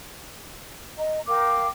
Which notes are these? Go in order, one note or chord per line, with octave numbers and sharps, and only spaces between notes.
D#5 A#5
A#4 F5 G5 D6